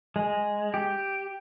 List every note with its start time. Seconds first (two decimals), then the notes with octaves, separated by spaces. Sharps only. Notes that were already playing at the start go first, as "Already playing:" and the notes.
0.16 G#3
0.74 G4